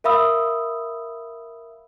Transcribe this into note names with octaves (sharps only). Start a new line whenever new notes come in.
A#4 E5 F5 B5 D#6 E6